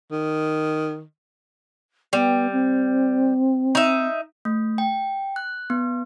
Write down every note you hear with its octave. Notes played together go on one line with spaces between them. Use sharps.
D#3
G3 B3
C4
D#4 E5
A3
G5
F#6
B3